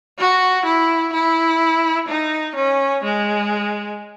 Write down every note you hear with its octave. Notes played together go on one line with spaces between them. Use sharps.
F#4
E4
E4
D#4
C#4
G#3